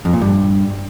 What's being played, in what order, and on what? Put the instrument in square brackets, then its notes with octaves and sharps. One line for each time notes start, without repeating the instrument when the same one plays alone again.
[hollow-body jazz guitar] F2
A#2
G2